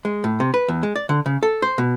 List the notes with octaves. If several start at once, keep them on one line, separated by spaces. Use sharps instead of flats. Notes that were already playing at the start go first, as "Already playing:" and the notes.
G#3
A2
C3
B4
E2
G#3
D5
D3
C#3
A4
C5
B2